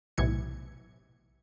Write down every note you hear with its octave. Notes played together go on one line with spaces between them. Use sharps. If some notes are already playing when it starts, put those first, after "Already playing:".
B1 A2 C3 E3 G#6 C#7